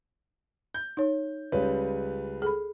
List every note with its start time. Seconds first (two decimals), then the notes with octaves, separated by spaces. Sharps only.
0.74 G6
0.97 D#4 C#5
1.52 C#2 G3 B4 C#5
2.42 G#4 A4 B5